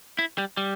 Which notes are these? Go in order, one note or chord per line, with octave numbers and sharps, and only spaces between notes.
E4
G3
G3